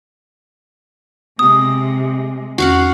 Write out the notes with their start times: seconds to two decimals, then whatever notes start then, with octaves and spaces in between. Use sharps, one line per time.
1.39 C3 G#3 D#6
2.58 E2 C#4 F#4 F5 F#5 F6